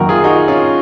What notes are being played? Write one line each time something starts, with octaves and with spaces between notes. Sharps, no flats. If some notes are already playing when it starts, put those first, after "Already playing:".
Already playing: F#2 D#3 A#3 F#4 A#4
F4 G#4
D#4 F#4
C#4 F4